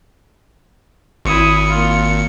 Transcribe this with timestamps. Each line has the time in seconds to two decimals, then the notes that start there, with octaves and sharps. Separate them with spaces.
1.25 G#1 E4 D#6 C#7
1.68 A#3 F4